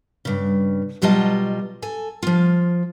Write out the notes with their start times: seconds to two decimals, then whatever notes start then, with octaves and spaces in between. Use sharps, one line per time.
0.25 G2 C#3
1.02 B2 F#3 G3 F4 D#5 A5
1.82 A4 G#5
2.23 F3 F4